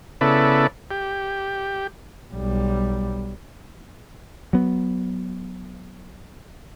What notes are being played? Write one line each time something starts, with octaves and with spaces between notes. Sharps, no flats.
C#3 B3 E4 A4 B4 D5
G4
B1 G3
F#3 B3